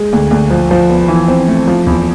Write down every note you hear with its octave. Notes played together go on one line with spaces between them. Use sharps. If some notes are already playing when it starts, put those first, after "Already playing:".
Already playing: G#3
D2
D2
F3
F3
B3
E3
C4
A3
F3
E2